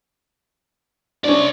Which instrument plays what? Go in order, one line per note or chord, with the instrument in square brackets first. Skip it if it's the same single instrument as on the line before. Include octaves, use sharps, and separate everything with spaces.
[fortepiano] C#4 D4 [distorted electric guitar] C5 D5